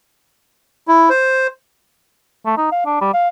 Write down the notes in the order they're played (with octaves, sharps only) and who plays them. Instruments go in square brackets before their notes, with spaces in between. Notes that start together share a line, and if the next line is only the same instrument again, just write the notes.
[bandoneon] E4
C5
[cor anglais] A3
D#4
F5
D4
G3
F5